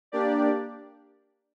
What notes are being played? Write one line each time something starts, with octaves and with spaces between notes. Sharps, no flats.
A#3 D4 G4 D5